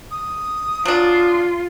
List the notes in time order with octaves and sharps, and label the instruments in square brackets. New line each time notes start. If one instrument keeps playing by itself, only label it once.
[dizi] D#6
[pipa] F#3 D4 [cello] F4